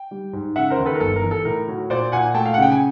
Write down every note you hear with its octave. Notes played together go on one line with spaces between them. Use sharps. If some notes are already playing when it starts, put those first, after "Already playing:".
Already playing: G5
G3
G#2
C#3 E5 F#5
A#4 C5
D#2
A4 B4
A#4
G1 A4
A#4
E3
A4
A2 A#4
F#3
A#2 C5 D5
A#2 F#5 G#5
A3 G5 A5
F5
F#5
C#3 G5
G#5